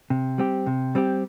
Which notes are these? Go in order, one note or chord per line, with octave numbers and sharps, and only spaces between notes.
C3
G3 C4 G4
C3
G3 C4 G4